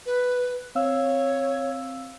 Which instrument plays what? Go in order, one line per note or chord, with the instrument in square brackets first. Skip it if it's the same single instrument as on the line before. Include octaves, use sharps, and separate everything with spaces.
[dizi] B4
[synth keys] C4 F5 E6 [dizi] C#5